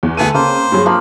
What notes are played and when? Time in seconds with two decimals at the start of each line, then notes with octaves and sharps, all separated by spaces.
0.03 E2
0.17 D2 B3 G#4 A4 D#7
0.34 C#3 A#3 C4 C5
0.72 G2 F#3 G#4
0.86 F3 A#3 B5